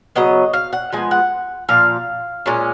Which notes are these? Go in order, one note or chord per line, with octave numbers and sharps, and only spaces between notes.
C#3 F#3 B3 D#5
F5
F#5
F3 G#3 B3 G#5
F#5
A#2 F3 F5
A#2 G#3 C#4